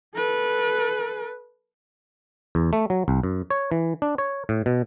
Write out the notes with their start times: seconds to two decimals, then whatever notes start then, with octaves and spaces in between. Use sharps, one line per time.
0.15 A4 B4
2.55 E2
2.73 A3
2.90 F#3
3.08 C2
3.23 F#2
3.51 C#5
3.72 E3
4.02 D4
4.18 C#5
4.49 A2
4.66 B2